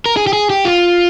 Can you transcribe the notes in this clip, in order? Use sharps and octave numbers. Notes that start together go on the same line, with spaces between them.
A#4
G#4
G4
G#4
G4
F4